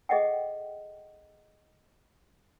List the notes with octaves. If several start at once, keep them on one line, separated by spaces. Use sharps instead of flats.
G#4 A4 D#5 E5 F#5 G5